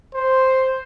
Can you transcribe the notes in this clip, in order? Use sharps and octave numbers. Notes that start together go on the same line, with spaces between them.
C5